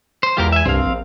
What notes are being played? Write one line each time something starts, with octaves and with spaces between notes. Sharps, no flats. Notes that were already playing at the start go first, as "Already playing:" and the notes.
C5
E2 E3 G#3 F4 G4 A#4
E5 G#5
C2 G2 C4 F5
A#1